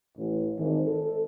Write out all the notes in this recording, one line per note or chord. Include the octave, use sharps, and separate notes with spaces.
A1
G#1
A4